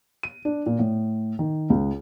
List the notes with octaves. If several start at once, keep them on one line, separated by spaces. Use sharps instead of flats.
D#7
D4
A#2
A2
D#3
C#2